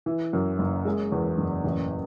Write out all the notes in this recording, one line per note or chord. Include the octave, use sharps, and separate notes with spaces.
E3
F#2
F#1
G#3
E2
F#1
A1